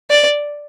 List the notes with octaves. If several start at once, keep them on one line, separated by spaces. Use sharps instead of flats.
D5